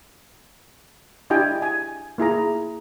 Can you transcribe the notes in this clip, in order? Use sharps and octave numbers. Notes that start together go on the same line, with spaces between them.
D4 E4 G4 D#5 G5 G#5
G#5
A#3 E4 G#4 A#5